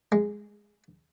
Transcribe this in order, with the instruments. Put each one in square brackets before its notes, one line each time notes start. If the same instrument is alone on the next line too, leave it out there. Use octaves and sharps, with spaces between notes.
[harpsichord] G#3